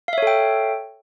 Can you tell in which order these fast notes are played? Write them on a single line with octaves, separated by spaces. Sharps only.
F5 E5 C#5 A4 G5